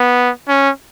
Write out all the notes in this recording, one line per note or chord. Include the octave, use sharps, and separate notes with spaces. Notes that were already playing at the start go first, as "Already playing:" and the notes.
Already playing: B3
C#4